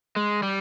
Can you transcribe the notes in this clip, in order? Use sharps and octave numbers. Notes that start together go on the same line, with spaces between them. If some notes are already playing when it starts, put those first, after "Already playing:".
G#3
G3